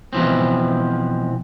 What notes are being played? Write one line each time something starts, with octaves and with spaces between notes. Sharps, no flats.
B2 E3 F3 C4